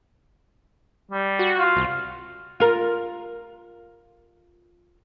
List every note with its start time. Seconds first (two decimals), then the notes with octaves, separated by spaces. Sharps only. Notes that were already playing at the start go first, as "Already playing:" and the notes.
1.11 G3
1.39 F#4
1.59 F4
1.76 C2
2.60 F4 A#4